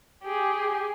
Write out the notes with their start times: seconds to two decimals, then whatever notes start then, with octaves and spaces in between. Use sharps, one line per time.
0.23 G4 G#4